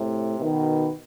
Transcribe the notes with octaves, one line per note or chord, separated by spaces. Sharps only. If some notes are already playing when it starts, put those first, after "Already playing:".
Already playing: A2 C3
B2 D#3